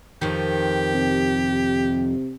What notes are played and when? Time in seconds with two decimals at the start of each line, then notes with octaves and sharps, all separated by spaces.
0.22 F2 D#3 G4
0.94 C3